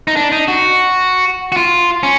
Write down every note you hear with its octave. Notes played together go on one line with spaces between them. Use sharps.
D#4
D4
D#4
F#4
F#4
F4
C#4